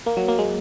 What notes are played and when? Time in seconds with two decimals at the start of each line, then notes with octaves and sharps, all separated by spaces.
0.06 A#3
0.17 F#3
0.28 A#3
0.38 G#3